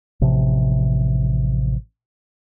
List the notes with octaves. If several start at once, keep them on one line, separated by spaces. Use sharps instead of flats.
A1 C3 F3